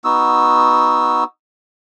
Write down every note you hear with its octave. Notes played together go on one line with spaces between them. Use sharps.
B3 D#4 F#4 E6